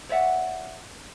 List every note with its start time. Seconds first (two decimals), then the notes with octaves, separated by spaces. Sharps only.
0.09 C#5 D5 E5 F#5